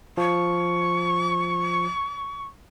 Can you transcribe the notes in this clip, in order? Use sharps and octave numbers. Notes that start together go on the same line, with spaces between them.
F3 C#6